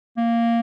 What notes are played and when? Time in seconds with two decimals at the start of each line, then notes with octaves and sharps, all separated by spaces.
0.17 A#3